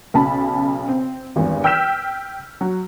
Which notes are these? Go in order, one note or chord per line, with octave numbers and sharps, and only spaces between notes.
B1 C#3 A5 B5
C4
G#1 E2 G2
G5 E6 F6 G6 B6 E7
F#3